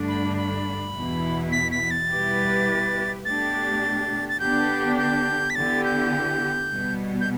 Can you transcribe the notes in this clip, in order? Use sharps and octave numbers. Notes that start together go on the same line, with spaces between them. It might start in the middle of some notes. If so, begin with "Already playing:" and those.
Already playing: G2 D3 A3 D4
B5
B5
E2 B2 B3 E4
B6
B6
A6
B2 G3 E4 G4 B4
B2 A3 D4 G4 A6
A6
D3 B3 D4 G4 G6
G6
B6
D3 B3 E4 G4 A6
G6
B2 G3 B3
G6